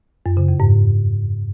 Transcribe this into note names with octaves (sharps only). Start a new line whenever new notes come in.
F#2
C#3
F2
G#2